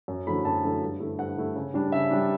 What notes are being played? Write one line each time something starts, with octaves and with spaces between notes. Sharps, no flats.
F#2
D3 F#3 A3 E4 B5
F#2 A5
D3 F#3 A3 E4
G2
D3 A3 E4
G2 F#5
D3 A3 E4
C#3
G3 D4
C#3 E5
G3 D4